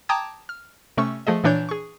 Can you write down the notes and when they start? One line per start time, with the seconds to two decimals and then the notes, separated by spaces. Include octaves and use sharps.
0.09 G5 A5 A#5 D6 D#6 G#6
0.49 F6
0.97 C3 A3 C#4 C#6 E6
1.27 F3 A3 G#4 D#5
1.44 A#2 E3 D4 C#5 G6
1.69 G#4 C#6